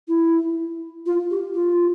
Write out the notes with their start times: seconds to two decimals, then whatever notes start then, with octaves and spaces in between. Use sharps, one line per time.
0.08 E4
1.06 F4
1.31 G4
1.54 F4